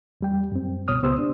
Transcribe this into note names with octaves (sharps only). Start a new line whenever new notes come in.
E2 G3 G5
F#2 C4
C2 B2 C#5 D#6 F6
C#2 B3 G4 C5 D#6 E6
D4